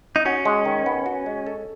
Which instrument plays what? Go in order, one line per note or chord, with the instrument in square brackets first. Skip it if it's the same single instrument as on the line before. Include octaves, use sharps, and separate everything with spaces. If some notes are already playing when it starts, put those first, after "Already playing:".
[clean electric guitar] D#4
[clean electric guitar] C#4 [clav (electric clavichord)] F#4
[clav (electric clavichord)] G#3
D#3
B3
F#4
G#3
A4